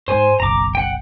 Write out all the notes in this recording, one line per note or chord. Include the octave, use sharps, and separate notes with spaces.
G#2 C5 G#5
F#1 B1 A#5 D6
F#5 G5